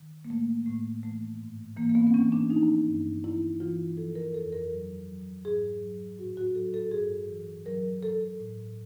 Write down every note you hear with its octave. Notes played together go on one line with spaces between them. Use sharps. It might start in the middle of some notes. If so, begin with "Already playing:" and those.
Already playing: D#3
A#3
A2 A3
A2 A3
E3 A3
G#2
E3 A#3
A#3
B3
C4
E3 C#4
D4
F3 D#4
G2
E3 E4
E3 F4
F3 A4
A#4
F2 A4
A#4
F#3
F#3
G#2 G#4
F#3
A2 F#4
F#4
F#3 A4
A4
G2 G#4
E3
F#3 A#4
F#3 A4
A2